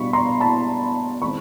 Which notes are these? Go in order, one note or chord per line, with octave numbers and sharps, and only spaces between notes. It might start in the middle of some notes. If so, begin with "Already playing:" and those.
Already playing: B2 G3 D4 B5 C#6
A#5 C6
A5 B5
D#3 G#3 C4 B5 C#6